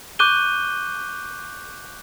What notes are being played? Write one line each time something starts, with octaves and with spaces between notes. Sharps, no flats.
C#6 D6 F#6 G6 D#7 G7